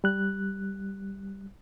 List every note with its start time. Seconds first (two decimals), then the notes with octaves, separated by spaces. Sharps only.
0.04 G3 F#6